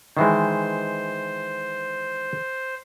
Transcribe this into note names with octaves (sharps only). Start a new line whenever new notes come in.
D#3 E3 G#3 C5